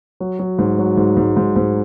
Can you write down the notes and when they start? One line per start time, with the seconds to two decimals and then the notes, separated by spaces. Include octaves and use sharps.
0.20 F#3
0.39 F#3
0.59 G#2
0.79 F#3
0.97 G#2
1.17 G#2
1.36 G#2
1.56 G#2